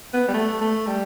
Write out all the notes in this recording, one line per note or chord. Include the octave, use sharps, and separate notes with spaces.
B3
G3
A3
A3
G3